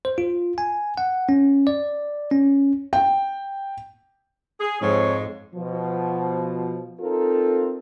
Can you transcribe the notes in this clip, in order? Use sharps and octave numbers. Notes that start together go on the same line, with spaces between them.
C5
F4
G#5
F#5
C#4
D5
C#4
G5
G#4
F2 G#2 C#5
B2 F3
C4 D#4 F4 A4 A#4